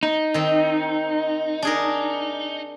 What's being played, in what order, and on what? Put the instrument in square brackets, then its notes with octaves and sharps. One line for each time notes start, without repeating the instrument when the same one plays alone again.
[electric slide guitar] D#4
[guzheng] D#3 C4
D4 G#4 A#4